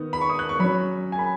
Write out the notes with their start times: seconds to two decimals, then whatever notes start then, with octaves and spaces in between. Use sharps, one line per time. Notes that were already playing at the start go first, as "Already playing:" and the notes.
Already playing: D#3 B3 D#4
0.13 B5
0.21 C#6
0.29 D#6
0.39 F#6
0.49 C#6
0.59 F#3 C#4 B5
1.12 G#5
1.19 B5